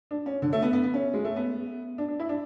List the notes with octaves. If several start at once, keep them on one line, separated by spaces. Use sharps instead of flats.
D4
C#4
D3
A3
B3
B3
B3
C#4
G#3
A3
B3
D4
D4
E4
D4